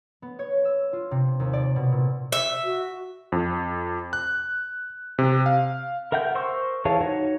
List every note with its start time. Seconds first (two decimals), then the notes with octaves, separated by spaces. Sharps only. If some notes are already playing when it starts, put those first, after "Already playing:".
0.22 B3
0.39 C#5
0.65 E6
0.93 F4
1.11 C3
1.40 D#2
1.53 D5
1.76 B2
1.92 A#2
2.32 E5
2.65 F#4
3.32 F2
4.13 F#6
5.19 C3
5.46 F5
6.12 A#4 E5 F#5 G5 G6
6.35 A#4 C5 C6 C#6 E6
6.85 E3 G#4 C#5 F5 A5
7.01 D#4 F#4 C#5